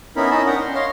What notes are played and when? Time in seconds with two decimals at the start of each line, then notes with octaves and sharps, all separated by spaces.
0.16 B3 C#4 D#4 E4 A#4 B5
0.31 C#4 D#4 D#5 A5 B5
0.46 D4 A#4 F#5 G5 A#5
0.61 C6
0.75 C#5 D#5 F5 C6